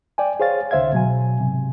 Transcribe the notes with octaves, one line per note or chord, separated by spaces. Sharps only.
D5 G5 G#5
G#4 C5 C#5 F5 A6
C2 D3 C5 E5 F5 G#6
B2 F#3 G#5
G#2 C3